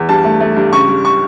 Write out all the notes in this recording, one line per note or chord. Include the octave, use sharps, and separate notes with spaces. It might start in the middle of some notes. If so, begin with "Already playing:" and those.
Already playing: E2
G2 A5
A3
A3
G2
C#2 C#6
G3
C#6